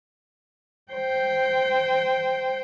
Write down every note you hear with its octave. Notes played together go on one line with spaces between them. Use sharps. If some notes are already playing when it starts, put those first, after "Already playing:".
C5 G5